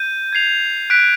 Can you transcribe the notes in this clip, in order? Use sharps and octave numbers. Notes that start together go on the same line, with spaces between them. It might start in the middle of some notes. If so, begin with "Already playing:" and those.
Already playing: G6 D#7
G#6 C7 F7
F#6 B6 D7